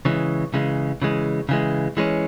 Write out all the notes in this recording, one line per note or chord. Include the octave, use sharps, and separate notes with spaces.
C#3 E3 G#3
C#3 E3 G#3
C#3 E3 G#3
C#3 E3 G#3
E3 G#3 C#4